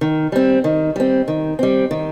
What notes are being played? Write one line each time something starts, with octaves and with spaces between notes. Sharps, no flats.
D#3
G3 C4
D#3
G3 C4
D#3
G3 C4
D#3